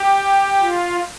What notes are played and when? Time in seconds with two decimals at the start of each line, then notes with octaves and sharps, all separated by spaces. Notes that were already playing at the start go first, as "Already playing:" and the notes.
Already playing: G4
0.61 F4